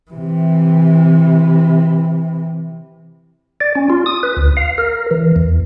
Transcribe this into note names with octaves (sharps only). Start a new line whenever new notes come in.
C3 E3
D5
C#4
F4
D#6
B4
D2
F5
A#4
E3
E2